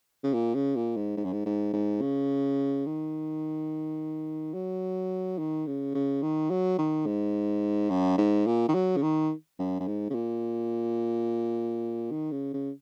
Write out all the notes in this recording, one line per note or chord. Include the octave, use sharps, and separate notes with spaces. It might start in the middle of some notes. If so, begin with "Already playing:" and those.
C#3
A#2
C#3
A#2
G#2
G#2
F#2
G#2
G#2
G#2
C#3
D#3
F#3
D#3
C#3
C#3
D#3
F#3
D#3
G#2
F#2
G#2
A#2
D#3
F#3
C#3
D#3
F#2
F#2
G#2
C#3
A#2
D#3
C#3
C#3